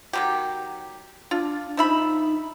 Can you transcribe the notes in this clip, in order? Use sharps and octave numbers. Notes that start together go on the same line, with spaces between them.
D#3 F#3 G4
D4 F4
F3 D#4 E5 B5